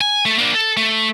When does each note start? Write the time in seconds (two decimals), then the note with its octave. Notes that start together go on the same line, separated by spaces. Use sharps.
0.01 G#5
0.25 A3
0.39 A#3 D4
0.54 A4
0.77 A3